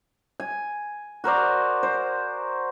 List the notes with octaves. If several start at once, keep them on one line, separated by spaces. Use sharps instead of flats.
G#5
F#4 A#4 C5 D5
C5